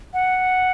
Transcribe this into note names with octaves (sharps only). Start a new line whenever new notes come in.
F#5